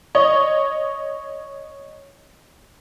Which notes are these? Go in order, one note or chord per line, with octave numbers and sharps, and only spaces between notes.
C#5 D#5